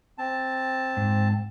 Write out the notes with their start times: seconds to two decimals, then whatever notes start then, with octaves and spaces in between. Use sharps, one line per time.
0.18 C4 A5
0.97 G#2